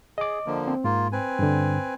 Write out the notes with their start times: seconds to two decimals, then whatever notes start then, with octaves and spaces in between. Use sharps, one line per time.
0.18 G#4 D#5 D6
0.46 D3 F3 A#3
0.68 C4
0.84 G#2 A#3 F4
1.12 C4 B4 G#5
1.39 G2 D3